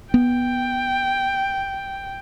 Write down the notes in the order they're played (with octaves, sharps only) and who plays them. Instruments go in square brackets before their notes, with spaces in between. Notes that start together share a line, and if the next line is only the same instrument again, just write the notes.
[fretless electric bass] B3 [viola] G5